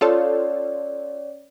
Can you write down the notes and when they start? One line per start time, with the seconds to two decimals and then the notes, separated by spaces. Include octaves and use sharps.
0.01 C#4 F4 A4 C#5 D5